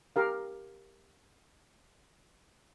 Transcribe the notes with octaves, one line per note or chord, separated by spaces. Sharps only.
G4 A#4 F5